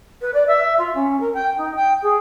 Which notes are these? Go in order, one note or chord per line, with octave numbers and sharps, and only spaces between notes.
B4
D5
E5
F4
C#4
A#4
G5
D#4
G5
G#4